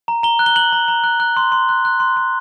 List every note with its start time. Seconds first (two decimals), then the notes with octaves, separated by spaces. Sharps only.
0.08 A#5
0.23 A#5 G7
0.39 F#6
0.46 G7
0.56 F#6 F#7
0.72 A#5
0.88 A#5
1.04 F#6
1.20 F#6
1.37 C6
1.52 C6
1.69 F#6
1.85 F#6
2.00 C6
2.17 C6